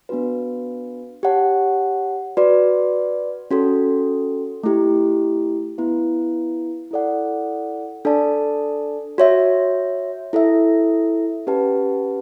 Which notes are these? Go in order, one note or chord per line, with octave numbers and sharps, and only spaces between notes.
B3 D4 F#4 B4
G4 C#5 F#5 A5
F#4 B4 D5
C#4 F#4 A4
A3 E4 G4
B3 E4 B4
E4 A4 D5 F#5
D4 A4 D5 A5
F#4 C#5 E5
E4 A4 E5
C#4 G4 B4 F#5 A5